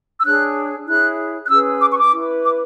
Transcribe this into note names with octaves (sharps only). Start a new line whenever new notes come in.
E6
D4 G#4 C#5 F#6
E4 G#4 C#5 F#6
F#6
C#4 G#4 B4 E6
D6
C#6
D6
E4 B4
D6